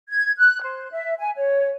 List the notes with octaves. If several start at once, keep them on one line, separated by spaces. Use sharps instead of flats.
G#6
F#6
C5
E5
G#5
C#5